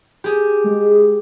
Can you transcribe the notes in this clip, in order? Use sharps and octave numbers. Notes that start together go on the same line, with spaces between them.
G4 G#4
G#3